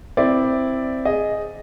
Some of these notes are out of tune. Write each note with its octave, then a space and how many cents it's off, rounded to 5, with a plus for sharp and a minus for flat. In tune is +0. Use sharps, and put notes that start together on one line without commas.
C4 +0 E4 +0 D5 +0
G#4 +0 D#5 +0